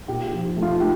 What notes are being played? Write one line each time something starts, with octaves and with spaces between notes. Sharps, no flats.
A#2 G4
G4
F3
A3
F4
A3 G4